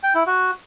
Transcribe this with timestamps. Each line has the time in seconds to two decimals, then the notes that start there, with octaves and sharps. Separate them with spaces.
0.03 G5
0.15 E4
0.27 F#4